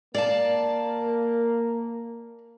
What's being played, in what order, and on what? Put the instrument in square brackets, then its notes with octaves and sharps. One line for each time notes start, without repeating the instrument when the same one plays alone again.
[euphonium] A#3 [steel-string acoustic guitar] D5 F5 A5